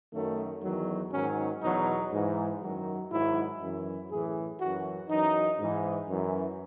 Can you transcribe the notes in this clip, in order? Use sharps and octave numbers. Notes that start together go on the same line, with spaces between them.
F#2 D#3 F#3 A3
E2 D#3 F#3
G#2 D#3 F#3 C#4
E2 B2 F#3 D#4
G#2 E3
F#2 D#3 F#3
G#2 D#3 F#3 E4
F#2 E3
A2 E3 G#4
F#2 E3 F#4
F#2 E3 D#4
G#2 E3
F#2 E3